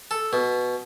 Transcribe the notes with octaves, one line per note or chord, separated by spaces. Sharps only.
A4
B2